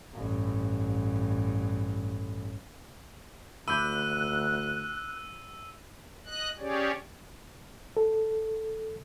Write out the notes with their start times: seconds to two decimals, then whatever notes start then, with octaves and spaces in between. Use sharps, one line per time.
0.14 A1 G2
3.68 D2 B5 D6 E6 F#6 G6 D#7
6.26 D#5 F#6
6.59 C#4 G4 G#4 C#5 D5
7.97 A4